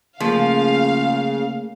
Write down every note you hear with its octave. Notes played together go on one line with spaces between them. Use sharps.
C#3 F3 A3 A#3 G#4 F5